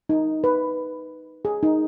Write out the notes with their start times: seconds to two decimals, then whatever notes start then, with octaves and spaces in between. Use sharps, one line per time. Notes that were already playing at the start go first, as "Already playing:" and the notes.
0.09 D#4
0.44 B4
1.45 G#4
1.63 D#4